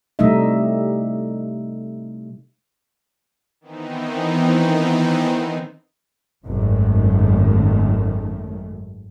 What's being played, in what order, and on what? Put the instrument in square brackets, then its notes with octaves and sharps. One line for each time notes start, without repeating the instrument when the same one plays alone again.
[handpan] C3 G3 A3 D#4 D#5 E5
[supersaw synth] D#3 E3 B3 C4 D#4
[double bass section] G#1 F#2 D#3 A3